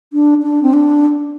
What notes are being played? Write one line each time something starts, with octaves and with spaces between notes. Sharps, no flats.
D4
D4
C4
D4